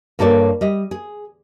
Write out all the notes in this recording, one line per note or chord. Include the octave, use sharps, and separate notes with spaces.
G2 A#3 A4 C#5 D5
G3 D#5
G#4